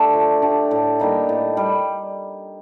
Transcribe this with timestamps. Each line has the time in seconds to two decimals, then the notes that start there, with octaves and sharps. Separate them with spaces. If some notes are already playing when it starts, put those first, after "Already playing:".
Already playing: A3 D4 G4
0.13 F3
0.42 A3 D4 G4
0.71 A2
1.00 G3 A#3 D#4
1.29 A2
1.57 G3